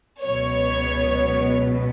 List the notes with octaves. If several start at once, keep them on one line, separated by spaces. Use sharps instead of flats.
C#2 B2 F#3 B3 C#5